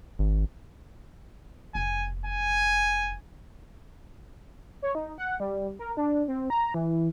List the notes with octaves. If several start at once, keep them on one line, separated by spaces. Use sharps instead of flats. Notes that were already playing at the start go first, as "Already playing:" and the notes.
G#1
F1 G#5
G#5
C#5
D#4
F#5
G3
A#4
D4
C4
A#5
E3